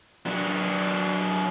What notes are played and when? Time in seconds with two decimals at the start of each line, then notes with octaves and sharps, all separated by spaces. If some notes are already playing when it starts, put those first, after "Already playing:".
0.26 F#3 D4